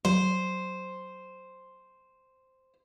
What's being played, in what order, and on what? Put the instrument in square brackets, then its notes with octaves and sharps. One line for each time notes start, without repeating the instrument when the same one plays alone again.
[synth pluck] F#3 [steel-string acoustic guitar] C5